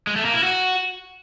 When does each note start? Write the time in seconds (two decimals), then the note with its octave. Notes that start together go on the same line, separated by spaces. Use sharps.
0.07 G#3
0.16 A3
0.25 A#3
0.34 E4
0.43 F#4